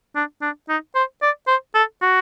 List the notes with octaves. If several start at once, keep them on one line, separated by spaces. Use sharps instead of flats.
D4
D4
D#4
C5
D5
C5
A4
F#4